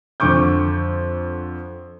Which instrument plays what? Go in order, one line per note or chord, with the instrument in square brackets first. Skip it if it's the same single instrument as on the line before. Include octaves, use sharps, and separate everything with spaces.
[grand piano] F2 D3 C#6 D6 G6